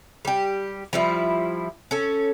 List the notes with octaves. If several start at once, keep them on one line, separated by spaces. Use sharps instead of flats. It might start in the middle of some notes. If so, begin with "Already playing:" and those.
G3 G4
F3 G3 E4
C#4 A4